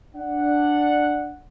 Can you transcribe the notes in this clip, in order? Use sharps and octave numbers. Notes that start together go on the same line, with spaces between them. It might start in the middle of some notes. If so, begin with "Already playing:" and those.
D4 F#5